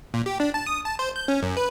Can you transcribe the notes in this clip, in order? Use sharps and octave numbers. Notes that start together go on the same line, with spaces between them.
A#2
G4
D4
A5
D#6
A5
C5
G6
C#4
F#2
B4